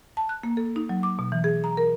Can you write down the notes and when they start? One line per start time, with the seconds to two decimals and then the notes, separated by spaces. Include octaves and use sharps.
0.17 A5
0.29 F#6
0.43 A#3
0.57 A4
0.76 D#4
0.89 F#3
1.03 D6
1.19 B2
1.32 E3
1.44 G#4
1.64 A#5
1.77 A#4